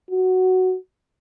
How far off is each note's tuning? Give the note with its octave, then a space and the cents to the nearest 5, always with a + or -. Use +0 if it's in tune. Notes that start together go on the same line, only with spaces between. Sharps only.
F#4 +5